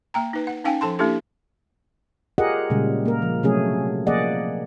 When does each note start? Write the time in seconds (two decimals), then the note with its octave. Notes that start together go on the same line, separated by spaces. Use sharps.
0.14 A#3 G5 A#5
0.33 D#4 B4
0.47 F#5
0.64 C#4 D#4 F5 G5 G#5
0.81 F3 A4 A5 C6
0.99 A#3 D4 E4 G4 A4
2.38 F4 G4 G#4 A#4 D#5 F#5
2.70 A#2 C#3 G3 G#3
3.06 A#3 A#4
3.22 F3
3.43 C3 F#3 A3 C#4 G#4
4.07 F3 A#3 G#4 D5 D#5 F#5